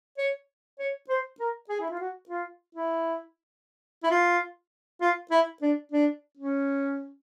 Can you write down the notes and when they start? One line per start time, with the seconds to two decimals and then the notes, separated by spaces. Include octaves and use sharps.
0.18 C#5
0.79 C#5
1.09 C5
1.39 A#4
1.69 G#4
1.80 E4
1.90 F4
2.00 F#4
2.29 F4
2.75 E4
4.03 E4
4.11 F4
5.01 F4
5.31 E4
5.62 D4
5.92 D4
6.37 C#4